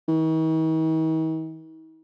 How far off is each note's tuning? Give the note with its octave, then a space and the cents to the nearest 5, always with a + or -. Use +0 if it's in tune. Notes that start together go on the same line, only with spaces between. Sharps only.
D#3 +45